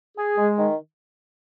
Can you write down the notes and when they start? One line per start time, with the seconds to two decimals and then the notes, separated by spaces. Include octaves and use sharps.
0.17 G#4
0.38 G#3
0.58 D#3